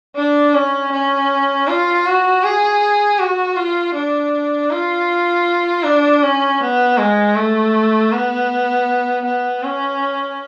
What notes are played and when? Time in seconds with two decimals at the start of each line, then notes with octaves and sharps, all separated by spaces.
0.16 D4
0.54 C#4
0.92 C#4
1.68 F4
2.06 F#4
2.44 G#4
3.19 F#4
3.56 F4
3.95 D4
4.71 F4
5.84 D4
6.23 C#4
6.61 B3
6.98 G#3
7.36 A3
8.11 B3
9.25 B3
9.63 C#4